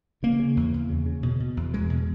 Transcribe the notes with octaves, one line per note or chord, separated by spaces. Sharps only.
C#3 A#3
C#3
E2
E2
C#3
C#3
B2
B2
E2
E2 G#3
B2